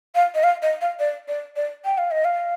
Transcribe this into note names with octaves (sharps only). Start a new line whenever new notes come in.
F5
D#5
F5
D#5
F5
D5
D5
D5
G5
F5
D#5
F5